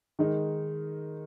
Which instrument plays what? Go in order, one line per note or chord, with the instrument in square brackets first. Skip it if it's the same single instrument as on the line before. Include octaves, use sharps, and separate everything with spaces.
[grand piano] D#3 G#3 D#4 A#4